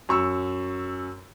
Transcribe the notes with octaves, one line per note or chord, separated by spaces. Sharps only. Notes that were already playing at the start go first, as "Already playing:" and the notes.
F#2 C#6 E6